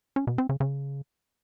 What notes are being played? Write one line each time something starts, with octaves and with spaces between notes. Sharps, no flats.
C#4
B2
C4
C#3
C#3